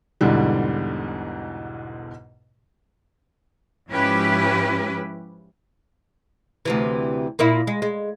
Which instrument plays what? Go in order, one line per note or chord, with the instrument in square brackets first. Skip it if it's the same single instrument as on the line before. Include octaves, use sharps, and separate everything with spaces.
[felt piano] B1 E2 G#2 B2 D3 G3
[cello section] G#2 F3 C#4 E4 G4 B4
[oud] D2 C3 E3
A#2 A#3 E4
G#3
G#3